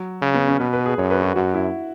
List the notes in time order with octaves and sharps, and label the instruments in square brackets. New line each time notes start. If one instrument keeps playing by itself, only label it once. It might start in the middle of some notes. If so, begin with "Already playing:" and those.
Already playing: [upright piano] F#3
[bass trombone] C#3
[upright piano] B3
C#4
[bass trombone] B2 [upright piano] B4
[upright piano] B4
G#4
[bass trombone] F#2 [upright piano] C#5
[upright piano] B4
F#4
[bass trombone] F#2 [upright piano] F#4
[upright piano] E4